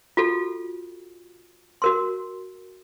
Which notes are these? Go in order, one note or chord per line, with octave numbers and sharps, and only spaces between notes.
F4 F#4 A4
F#4 A#4 C6